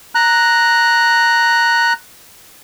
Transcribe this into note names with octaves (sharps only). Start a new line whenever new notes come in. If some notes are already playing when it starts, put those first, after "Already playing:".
A#5 F#6